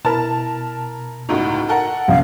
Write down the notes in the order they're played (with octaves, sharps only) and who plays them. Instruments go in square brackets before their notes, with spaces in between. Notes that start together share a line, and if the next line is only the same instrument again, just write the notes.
[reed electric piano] B2 [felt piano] E4 A#4 B5 [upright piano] A5
[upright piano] G1 C#2 A2 [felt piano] D#4 F#4
[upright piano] A4 A#4 F#5
[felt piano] A#1 F#2 [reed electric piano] C3 F3 G3 [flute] F5